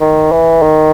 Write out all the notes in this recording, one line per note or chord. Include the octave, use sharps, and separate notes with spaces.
D#3
E3
D#3